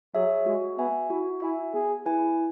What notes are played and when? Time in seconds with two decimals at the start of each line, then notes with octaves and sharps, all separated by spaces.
0.15 F#3 G#4 C#5 E5
0.46 G#3 F#4
0.78 B3 E5 G#5
1.10 E4 F#4
1.42 E4 E5 G#5
1.74 B3 G#4
2.06 E4 B4 E5 G#5